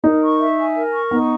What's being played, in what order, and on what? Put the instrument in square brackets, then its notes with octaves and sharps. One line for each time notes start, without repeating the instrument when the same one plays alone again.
[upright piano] D#4 [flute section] A#4
[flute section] C#6
E5
G#5
A#4
C#6
[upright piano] B3 [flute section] D#4